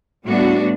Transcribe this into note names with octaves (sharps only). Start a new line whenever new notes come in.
A2 G3 B3 D4 F#4